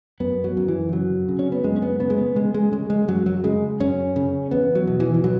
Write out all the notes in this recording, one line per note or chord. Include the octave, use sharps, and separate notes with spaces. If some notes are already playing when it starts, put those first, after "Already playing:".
F#2 B3
F#3
F#2
E3
C#3 F#3
C#3
C#4
B3
F#2 G#3
C#4
B3
C#3 B3
G#3
B3
C#3 G#3
G#3
C#3 G#3
G#3
F#2 F#3
F#3
C#3 G#3
F#2 C#4
C#3
E2 B3
F#3
B2
E3
E3
B2 F#3